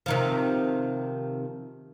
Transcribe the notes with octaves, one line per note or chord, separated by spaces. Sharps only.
C3 D#3 F3